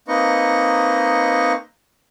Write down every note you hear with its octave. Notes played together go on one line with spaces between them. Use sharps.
A#3 C4 D#4 B4 D#5 C#6